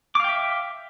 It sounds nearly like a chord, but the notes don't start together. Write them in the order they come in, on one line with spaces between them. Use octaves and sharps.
D6 F5 G5 E5